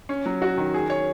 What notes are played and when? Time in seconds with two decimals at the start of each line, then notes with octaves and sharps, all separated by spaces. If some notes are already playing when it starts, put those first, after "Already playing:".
0.09 C#4
0.26 F#3
0.42 F#4
0.57 D#3
0.74 G#4
0.90 C#5